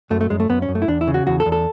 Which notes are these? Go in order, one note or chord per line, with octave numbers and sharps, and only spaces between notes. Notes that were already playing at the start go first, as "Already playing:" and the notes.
F#2 A3
A3
F#2 G#3
A3
F#2 B3
C#4
F#2
A3
E4
E2 D4
E4
C#3
F#4
E2 F#4
A4
E2
A4